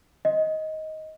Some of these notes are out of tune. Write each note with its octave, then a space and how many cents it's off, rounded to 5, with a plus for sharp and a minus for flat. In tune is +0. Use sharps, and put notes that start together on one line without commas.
D#5 +15